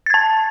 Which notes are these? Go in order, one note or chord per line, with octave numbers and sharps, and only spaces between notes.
A5 G#6 A6